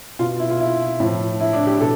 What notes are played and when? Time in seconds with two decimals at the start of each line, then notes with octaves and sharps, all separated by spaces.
0.19 B2 F4
0.39 E4
0.50 F4
0.60 E4
1.00 A2 F3
1.40 E4
1.53 D4
1.67 G4
1.80 B2 A4